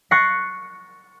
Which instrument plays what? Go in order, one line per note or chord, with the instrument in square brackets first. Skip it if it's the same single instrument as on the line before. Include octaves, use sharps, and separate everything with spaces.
[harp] C#6 F#6 A6 A#6 C7 C#7